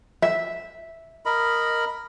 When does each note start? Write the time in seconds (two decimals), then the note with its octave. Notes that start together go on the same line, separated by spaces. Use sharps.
0.22 E5
1.26 A#4 D#5 B5